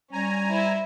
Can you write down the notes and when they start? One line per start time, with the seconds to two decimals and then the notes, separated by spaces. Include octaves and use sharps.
0.13 G3 C#4 G#5 A#5
0.50 E4 C5